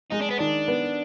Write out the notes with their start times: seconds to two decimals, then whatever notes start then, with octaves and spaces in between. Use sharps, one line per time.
0.12 G#3 D#4
0.22 D4
0.31 B3
0.39 D#3 D4
0.68 B3